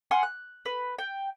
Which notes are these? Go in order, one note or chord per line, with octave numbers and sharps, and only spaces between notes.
F#5 G#5 C6 F6
F#6
B4
G5